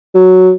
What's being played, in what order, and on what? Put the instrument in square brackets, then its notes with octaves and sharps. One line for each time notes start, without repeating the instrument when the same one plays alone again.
[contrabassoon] F#3